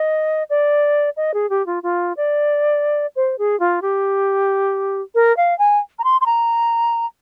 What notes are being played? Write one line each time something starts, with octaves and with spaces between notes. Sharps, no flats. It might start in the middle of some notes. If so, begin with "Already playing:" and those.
Already playing: D#5
D5
D#5
G#4
G4
F4
F4
D5
C5
G#4
F4
G4
A#4
F5
G#5
A#5
C6
C6
A#5